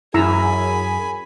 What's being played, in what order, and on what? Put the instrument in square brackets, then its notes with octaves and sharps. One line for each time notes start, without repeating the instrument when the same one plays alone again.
[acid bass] F#2 [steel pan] E4 A#5 E6 [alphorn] G#4 [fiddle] G#5 B5